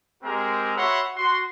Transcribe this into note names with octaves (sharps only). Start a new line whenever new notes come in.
G#3 C4 G4 G#4 A#4 A#5
F#4 C#5 E5 F#5 B5 C6
F#4 C6